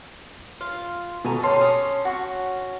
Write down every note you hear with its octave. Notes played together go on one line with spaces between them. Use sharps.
F4
B2 A4 G#5 A#5
C#4 E4 G4 A5 C6
C#4 D#6
F#4 C#6